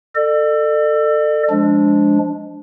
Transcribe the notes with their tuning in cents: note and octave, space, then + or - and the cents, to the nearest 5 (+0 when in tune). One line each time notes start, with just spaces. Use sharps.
A4 +20 D5 +45
F3 +0 G#3 +0 D4 -10